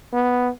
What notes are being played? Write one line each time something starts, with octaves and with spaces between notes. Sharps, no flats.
B3